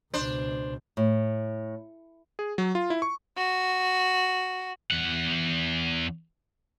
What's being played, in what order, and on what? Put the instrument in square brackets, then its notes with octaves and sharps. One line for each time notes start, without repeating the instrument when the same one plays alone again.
[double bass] C#2 B2 [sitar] D4 C5
[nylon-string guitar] A2
[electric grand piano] G#4
F#3
F4
E4
C#6
[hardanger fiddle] F#4
[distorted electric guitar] E2 F#5